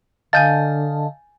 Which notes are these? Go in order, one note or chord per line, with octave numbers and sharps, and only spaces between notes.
D3 D#5 F5 G#5 A5 G6 A6